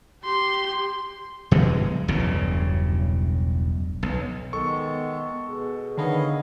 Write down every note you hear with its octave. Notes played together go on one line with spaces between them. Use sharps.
G4 C6
D1 B2 F#3 G#3
E1 B1 G2 C#3
B1
D#3 G#3 B3 A4 C#6
B2 G#4
D3 D#3 B3 C#5 D#5 F5